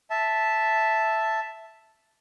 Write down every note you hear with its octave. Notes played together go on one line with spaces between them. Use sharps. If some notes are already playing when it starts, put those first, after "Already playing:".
E5 A5